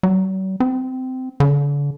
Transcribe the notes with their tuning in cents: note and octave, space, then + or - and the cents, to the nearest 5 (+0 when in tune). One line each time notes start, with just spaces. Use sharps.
F#3 +45
C4 -20
D3 -40